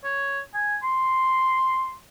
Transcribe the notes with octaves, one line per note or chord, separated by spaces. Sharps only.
C#5
G#5
C6